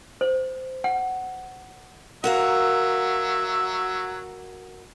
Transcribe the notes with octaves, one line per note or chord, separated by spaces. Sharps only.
C5
F#5
F#3 F#4 A#4 E5 F5